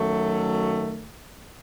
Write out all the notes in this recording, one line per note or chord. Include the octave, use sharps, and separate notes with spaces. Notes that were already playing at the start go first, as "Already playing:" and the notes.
Already playing: F#2 D#3 F#3 A3